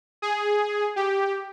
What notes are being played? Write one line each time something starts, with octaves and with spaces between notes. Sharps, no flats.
G#4
G4